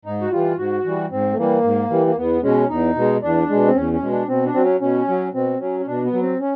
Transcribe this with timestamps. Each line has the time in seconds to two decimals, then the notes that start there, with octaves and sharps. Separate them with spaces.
0.05 G#2 D#4
0.21 F#4
0.31 E3 G3 F4
0.58 G#2 F#4
0.85 E3 G3
1.11 G#2 C4
1.33 A3
1.37 E3 G3 A#3
1.64 G#2
1.90 E3 G3
2.07 A#3
2.17 E2 B3
2.43 B2 G#3 C#4
2.69 E2 D#4
2.96 B2 G#3
3.22 E2 D4
3.50 B2 G#3
3.67 C4
3.75 E2 C#4
3.93 C#4
4.02 B2 G#3
4.11 D4
4.28 B2 C4
4.45 D4
4.54 F#3 C4
4.64 C#4
4.80 B2 C#4
5.08 F#3
5.34 B2 C4
5.60 F#3 C#4
5.80 C#4
5.87 B2 D4
6.04 B3
6.13 F#3
6.22 C4
6.40 C#4